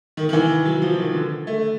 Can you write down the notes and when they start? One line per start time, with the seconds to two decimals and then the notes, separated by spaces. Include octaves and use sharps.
0.17 D#3
0.29 D#3
0.33 E3
0.65 F#3
0.82 F3
0.98 D#3
1.14 D3
1.47 A3